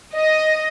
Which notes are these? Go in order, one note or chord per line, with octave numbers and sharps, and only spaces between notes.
D#5